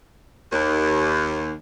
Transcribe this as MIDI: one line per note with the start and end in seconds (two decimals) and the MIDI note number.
0.53 1.53 39